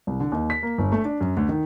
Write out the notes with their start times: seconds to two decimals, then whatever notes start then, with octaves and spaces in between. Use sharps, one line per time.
0.07 C2
0.20 D3
0.32 D#2
0.50 B6
0.63 A#3
0.78 G1
0.92 A3
1.05 D4
1.21 F#2
1.37 D2
1.49 D#3